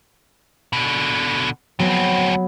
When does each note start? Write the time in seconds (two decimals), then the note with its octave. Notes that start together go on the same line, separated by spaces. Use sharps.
0.73 B2 D3
1.79 D2 F#3 B3 C4